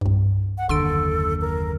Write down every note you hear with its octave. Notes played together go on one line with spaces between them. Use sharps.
C2 G2
F#5
F#1 D#2 D3 A4 C6 E6 D7
A#4